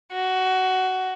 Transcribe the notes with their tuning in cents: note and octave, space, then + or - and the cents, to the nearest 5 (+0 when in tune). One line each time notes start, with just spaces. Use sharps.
F#4 +15